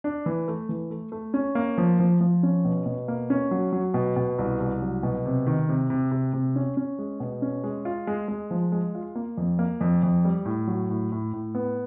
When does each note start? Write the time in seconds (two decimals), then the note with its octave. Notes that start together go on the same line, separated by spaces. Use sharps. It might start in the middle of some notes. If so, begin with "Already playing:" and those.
0.04 D4
0.26 E3
0.48 A3
0.69 E3
0.91 A3
1.12 A3
1.34 C#4
1.55 A#3
1.78 F3
1.99 F3
2.21 F3
2.43 C#4
2.65 B2
2.86 B2
3.08 A#3
3.30 C#4
3.51 F#3
3.73 F#3
3.94 B2
4.16 B2
4.39 C2
4.60 C2
4.82 F#3
5.03 B2
5.26 C3
5.46 D#3
5.69 C3
5.90 C3
6.11 C3
6.33 C3
6.56 C#4
6.77 C#4
6.99 G#3
7.20 B2
7.42 C#4
7.64 G#3
7.85 F4
8.07 G#3
8.28 G#3
8.51 F3
8.72 G#3
8.95 F4
9.15 A#3
9.37 F2
9.59 A#3
9.81 F2
10.03 F2
10.25 G3
10.45 A2
10.67 F#3
10.90 A2
11.12 A2
11.33 A2
11.55 B3